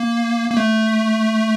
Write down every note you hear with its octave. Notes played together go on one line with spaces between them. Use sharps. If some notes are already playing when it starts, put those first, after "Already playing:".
Already playing: A#3
A#3
A3